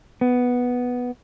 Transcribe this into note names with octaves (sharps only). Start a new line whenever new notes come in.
B3